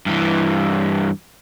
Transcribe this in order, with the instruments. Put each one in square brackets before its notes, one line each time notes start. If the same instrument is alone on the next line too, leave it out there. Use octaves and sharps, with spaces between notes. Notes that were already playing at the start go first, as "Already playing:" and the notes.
[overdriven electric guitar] G2 E3